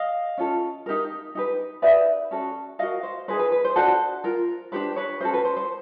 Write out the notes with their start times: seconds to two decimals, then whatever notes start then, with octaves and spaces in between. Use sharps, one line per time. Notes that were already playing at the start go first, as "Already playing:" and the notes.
Already playing: D#5 F5
0.38 C#4 F4 A4
0.86 D#4 G4 A#4
1.35 D#4 G4 B4
1.82 D#4 G4 B4 D5 E5
2.31 C#4 F#4 A4
2.79 D#4 F#4 A#4 D#5 F5
3.03 C5
3.28 D#4 G#4 B4 C5
3.39 B4
3.52 B4
3.65 C5
3.76 D4 F#4 A4 C5
4.24 F4 A#4
4.72 D4 G4 B4 C5
4.96 B4 C#5
5.20 C#4 F#4 A4 C5
5.34 B4
5.45 C5
5.57 C5